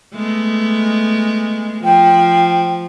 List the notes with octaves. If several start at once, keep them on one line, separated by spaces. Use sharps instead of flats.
G#3 A3 B3
F3 G5